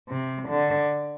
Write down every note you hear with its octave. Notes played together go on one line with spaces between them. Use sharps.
C3
D3